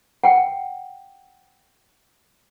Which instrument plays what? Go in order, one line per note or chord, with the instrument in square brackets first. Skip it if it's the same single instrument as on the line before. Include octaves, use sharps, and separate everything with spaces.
[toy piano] F#5 G5